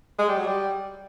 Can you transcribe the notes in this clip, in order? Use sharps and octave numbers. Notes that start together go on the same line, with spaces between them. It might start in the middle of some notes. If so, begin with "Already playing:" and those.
G#3
G3
F#3
G3